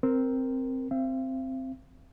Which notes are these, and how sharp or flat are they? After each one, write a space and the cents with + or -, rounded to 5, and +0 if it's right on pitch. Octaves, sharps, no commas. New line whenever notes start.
C4 +0 A#4 +0
C4 +0 F5 -45